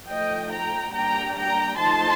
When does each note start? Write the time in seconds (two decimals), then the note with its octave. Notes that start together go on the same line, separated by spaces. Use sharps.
0.09 F3 A3 D#4 D#5 G5
0.51 G5 A#5
0.93 G3 A#3 D4 G5 A#5
1.36 G5 A#5
1.78 F3 A3 D#4 A5 C6